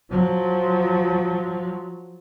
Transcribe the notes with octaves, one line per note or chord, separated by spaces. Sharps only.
F3 F#3